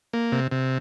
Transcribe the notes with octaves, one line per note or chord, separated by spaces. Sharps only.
A#3
C3
C3